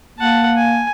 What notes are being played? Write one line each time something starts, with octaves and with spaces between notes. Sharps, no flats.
A#3 F#5 A5
G#5